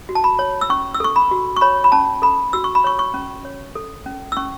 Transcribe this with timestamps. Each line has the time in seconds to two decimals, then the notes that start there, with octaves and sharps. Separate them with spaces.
0.09 F#4
0.15 A5
0.24 B5
0.39 C#5
0.61 E6
0.70 C#4 C#6
0.94 E6
1.00 A4 C#6
1.16 B5
1.31 F#4
1.57 C#6
1.61 C#5 B5
1.84 B5
1.92 C#4 A5
2.22 A4 B5
2.53 F#4 E6
2.64 C#6
2.75 B5
2.84 C#5 C#6
2.99 C#6
3.14 C#4
3.45 C#5
3.75 A4
4.06 C#4
4.32 E6
4.37 C#4 C#6